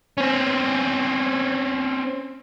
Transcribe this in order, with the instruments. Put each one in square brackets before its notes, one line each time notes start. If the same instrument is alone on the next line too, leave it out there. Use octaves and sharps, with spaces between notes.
[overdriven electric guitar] C4 C#4